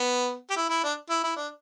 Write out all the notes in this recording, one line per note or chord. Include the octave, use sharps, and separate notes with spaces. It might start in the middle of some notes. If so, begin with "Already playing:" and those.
Already playing: B3
G4
E4
E4
D4
E4
E4
D4